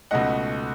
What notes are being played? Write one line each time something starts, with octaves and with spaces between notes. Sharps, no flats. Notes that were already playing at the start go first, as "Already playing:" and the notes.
C#2 B2 A3 D#4 D#5 F#5